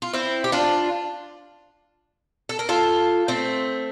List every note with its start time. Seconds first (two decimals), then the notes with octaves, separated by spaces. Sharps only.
0.02 F4
0.14 C4 E4
0.44 G4
0.52 D4 F4
2.49 A4
2.59 A#4
2.69 F4 A4
3.28 A3 C4